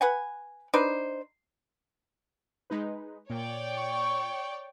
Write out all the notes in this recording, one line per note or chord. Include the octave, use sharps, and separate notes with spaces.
B4 F#5 G#5
D4 D#4 B4 C5
G#3 D#4 B4
A#2 C#5 D5 G5
C#6